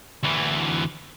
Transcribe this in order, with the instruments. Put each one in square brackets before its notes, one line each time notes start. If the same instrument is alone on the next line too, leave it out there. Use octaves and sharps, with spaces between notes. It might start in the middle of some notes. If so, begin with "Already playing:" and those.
[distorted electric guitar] D2 E3